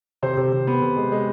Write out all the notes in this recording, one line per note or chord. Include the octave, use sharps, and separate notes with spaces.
C3 C5
C3
C3
B3
C3
G#3
G#3